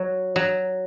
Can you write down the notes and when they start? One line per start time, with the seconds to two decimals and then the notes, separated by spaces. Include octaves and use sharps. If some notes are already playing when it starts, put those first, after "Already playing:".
Already playing: F#3
0.36 F#3